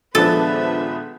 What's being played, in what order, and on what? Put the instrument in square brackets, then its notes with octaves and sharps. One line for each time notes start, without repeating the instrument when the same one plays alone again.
[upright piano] D#1 G#3 B3 [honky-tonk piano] F3 D4 [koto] A4 [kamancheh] B4 E5